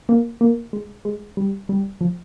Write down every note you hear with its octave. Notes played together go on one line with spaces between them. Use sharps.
A#3
A#3
G#3
G#3
G3
G3
F3